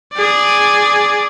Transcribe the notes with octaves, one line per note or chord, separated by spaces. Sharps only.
G#4 D5